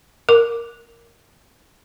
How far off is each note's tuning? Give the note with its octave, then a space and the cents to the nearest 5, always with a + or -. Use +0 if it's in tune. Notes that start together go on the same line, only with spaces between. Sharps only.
A#4 +0 D6 +0